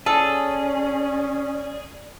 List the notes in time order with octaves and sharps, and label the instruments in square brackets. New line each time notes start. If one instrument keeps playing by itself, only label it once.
[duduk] C#4 [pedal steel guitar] G#4 [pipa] A4 [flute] D5